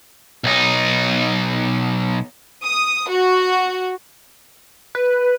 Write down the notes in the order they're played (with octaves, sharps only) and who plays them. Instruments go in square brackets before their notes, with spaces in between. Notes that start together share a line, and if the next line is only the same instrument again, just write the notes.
[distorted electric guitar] B1 D#4
[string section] D#6
F#4
[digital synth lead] B4